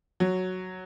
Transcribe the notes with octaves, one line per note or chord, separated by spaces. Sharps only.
F#3